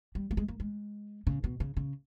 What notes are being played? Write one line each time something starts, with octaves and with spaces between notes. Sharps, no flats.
G3
A#3
G#3
A#3
G#3
C#3
B2
C#3
C#3